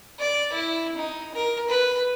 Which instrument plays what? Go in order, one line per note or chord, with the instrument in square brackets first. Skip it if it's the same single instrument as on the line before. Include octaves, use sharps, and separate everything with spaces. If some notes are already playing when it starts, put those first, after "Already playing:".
[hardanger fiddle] D5
E4
D#4
A#4
B4